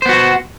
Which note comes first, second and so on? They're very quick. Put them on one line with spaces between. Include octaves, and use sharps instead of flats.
C5 B3 F#4